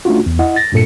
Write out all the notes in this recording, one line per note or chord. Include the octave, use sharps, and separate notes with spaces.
A3 C#4 D4 F4 F#4
E2
E4 D#5 F#5
A6 A#6
G2 A#2 A4 C#7